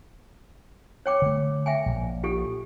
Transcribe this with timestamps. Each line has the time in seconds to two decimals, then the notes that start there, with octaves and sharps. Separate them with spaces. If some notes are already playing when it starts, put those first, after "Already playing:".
1.06 C#5 G5 D6
1.22 D3 A3
1.66 E5 G5 G#5
1.86 A#1
2.23 F4 G4 A4